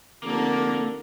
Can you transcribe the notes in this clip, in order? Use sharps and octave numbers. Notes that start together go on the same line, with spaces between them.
F1 D3 A#3 A#4